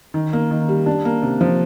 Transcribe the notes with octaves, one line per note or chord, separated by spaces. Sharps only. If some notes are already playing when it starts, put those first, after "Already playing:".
D#3
A#3
D#3
G3
D4
A#3
C3
F3